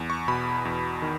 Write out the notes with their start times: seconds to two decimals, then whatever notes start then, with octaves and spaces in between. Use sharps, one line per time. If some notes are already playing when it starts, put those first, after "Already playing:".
Already playing: E2
0.10 C#6
0.28 B2 B5
0.65 E2
1.02 D#3